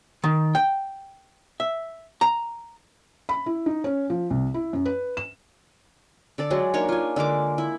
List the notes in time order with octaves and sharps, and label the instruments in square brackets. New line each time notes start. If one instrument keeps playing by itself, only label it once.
[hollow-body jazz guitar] D#3
G5
E5
A#5
[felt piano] B5
E4
D#4
C#4
F3
C2
E4
F#2
B4
E7
[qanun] D3 A4 D5
F#3 G#3 G#4
A#3 D4 D#4 C#5
F4 G#5
D3 G#3 A#3 D6
E4